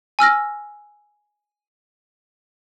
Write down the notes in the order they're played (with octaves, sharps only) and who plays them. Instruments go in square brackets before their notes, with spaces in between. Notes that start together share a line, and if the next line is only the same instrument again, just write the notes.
[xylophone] G#5 E6 F6 A#6